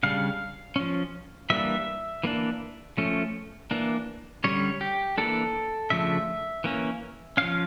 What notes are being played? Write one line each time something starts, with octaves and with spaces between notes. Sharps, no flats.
C#3 G3 D4 F5
F3 C#4
E3 G3 A#3 D4 E5
E3 A#3 D4
F3 A3 C#4
E3 A#3 D4
D3 G3 C#4 C#5
G4
E3 A#3 D4 A4
C#3 F3 A3 D4 E5
E3 A#3 C#4
F3 C#4 F5